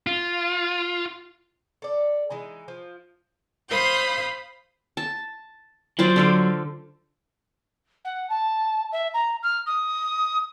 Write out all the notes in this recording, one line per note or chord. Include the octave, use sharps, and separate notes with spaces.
F4
A4 D5
E3 G#3 D#4
F3
C5 F5 B5 D#6 G6
A5
F#3 F4 C5 D5
D3 A4 F5
F#5
A5
E5
A#5
F6
D#6